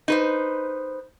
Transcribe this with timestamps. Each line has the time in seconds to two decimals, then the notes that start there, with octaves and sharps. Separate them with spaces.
0.08 D#4 B4 C5